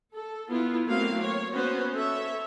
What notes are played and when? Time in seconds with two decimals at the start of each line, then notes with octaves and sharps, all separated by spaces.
0.14 A4
0.51 B3 E4 F4
0.87 F#3 A3 A#3 C4 F5
1.22 C#5
1.53 B3 C#4 F#4 B4 C5
1.95 A4 C#5 E5